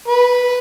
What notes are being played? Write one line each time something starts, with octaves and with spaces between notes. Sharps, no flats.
B4